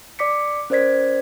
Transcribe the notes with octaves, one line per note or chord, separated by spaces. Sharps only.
D5 D6 B6 C#7
C#4 A#4 C5 D5 G#6 B6